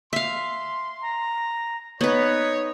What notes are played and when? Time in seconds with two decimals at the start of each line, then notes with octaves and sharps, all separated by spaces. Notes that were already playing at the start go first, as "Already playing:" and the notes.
0.13 E5 F5 C6
1.02 A#5
2.01 B3 D#4 B4 C#5